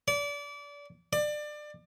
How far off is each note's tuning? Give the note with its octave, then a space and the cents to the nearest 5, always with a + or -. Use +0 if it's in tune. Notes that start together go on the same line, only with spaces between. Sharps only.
D5 -30
D5 +25